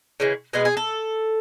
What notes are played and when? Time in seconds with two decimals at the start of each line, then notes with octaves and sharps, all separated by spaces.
0.20 C#3 E3 G#3
0.53 B2 G#3 B3 G#4
0.65 G#4
0.77 A4